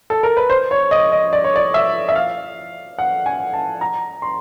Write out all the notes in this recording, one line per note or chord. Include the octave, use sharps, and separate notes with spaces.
A4
A#4
B4
C5
C#5
D#5
D#5
D5
C#5
D5
E5
E5
F5
F#5
G#5
A5
A#5
C6